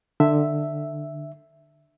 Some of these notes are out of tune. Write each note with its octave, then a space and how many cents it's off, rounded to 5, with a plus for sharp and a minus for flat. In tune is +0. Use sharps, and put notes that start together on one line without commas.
D3 +20 E5 +0